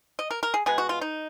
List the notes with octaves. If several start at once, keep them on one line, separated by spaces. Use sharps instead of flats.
D#5
A#4
A#4
G#4
B2 G#3 B3 G#4
F#4
F4
D#4